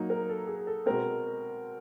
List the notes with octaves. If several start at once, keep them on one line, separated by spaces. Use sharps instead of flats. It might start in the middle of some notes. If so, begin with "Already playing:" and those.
Already playing: F#3 A#3 D#4
A#4
A4
G#4
A4
B2 G#3 C4 A#4